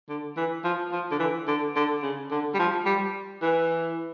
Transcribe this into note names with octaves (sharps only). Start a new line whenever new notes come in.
D3
E3
F3
F3
D3
E3
D3
D3
C#3
D3
G3
F3
G3
E3